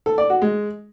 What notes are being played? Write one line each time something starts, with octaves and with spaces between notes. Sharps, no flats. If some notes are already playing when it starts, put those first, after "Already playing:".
A4
D5
F#4
G#3